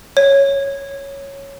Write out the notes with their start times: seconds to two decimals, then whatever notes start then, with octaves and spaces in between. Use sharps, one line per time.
0.17 C#5